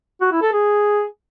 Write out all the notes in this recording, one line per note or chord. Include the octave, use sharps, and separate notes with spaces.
F#4
E4
A4
G#4